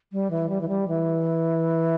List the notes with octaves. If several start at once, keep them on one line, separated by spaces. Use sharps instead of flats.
G3
E3
G3
E3
G3
E3